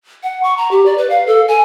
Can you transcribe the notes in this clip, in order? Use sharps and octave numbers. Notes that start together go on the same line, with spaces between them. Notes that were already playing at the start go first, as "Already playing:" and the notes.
F#5
C#6
A#5
G4
D5
B4
F5
A4
G#5